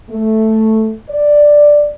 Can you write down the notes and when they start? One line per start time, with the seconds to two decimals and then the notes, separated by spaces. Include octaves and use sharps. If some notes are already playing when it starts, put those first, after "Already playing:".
0.10 A3
1.10 D5